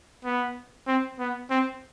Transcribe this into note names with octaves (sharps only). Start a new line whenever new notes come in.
B3
C4
B3
C4